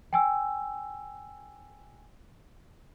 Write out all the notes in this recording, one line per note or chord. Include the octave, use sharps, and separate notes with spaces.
G5 G#5 E6